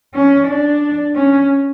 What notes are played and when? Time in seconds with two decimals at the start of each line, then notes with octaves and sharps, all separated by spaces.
0.14 C#4
0.48 D4
1.15 C#4